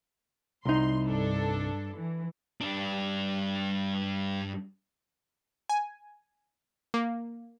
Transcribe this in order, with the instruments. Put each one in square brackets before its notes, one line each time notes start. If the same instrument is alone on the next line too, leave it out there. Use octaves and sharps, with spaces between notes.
[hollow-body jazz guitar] C2 D#4 [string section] C6
[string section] G2 D4 A4
E3
[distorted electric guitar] G2 D4
[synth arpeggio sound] G#5
A#3